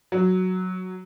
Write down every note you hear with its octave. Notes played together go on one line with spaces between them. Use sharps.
F#3